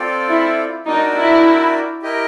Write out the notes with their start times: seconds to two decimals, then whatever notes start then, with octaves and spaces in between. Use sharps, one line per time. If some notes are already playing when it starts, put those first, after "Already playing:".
Already playing: C4 F4 A4 D5 G5
0.29 E4
0.87 D4 D#4 F#4 A#4 D5 G5
1.16 E4
2.02 E4 G4 A#4 D#5 G5